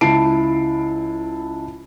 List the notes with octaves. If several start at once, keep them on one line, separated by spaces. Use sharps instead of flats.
C#2 E4 A5 C7 D7